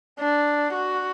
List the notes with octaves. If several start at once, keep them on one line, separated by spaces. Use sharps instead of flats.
D4
F#4